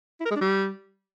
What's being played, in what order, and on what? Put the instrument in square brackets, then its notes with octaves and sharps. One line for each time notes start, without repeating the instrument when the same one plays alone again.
[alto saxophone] E4
A#4
G#3
D4
G3